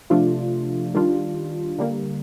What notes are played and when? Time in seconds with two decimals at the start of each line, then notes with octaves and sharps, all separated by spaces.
0.10 C3 F3 A3 D4 F4
0.94 D#3 G3 D4 F4
1.78 D3 G3 A#3